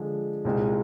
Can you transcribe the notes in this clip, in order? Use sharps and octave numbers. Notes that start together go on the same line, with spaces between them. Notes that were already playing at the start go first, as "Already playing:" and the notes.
Already playing: D3 F3 G#3
C2 A#2 G#3 C4 D#4